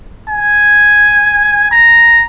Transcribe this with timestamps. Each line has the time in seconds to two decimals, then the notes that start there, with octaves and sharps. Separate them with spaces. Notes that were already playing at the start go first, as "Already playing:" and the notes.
0.29 G#5
1.71 A#5